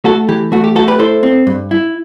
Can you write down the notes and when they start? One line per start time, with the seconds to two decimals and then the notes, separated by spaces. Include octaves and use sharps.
0.04 A3 F#4 A4
0.28 E3 G4
0.52 A3 F#4
0.64 G4
0.75 A3 F#4 A4
0.88 G4 B4
0.99 E4 A4 C5
1.23 C4
1.47 G2
1.71 E4